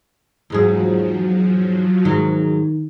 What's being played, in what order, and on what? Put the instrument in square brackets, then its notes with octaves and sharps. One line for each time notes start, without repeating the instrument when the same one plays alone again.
[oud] E2 G#2 G#4 [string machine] F3 F#3
[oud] G#2 F#3 [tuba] D#3